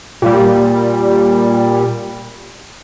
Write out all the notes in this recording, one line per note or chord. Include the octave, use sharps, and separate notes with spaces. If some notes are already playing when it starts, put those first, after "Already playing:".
A#2 G3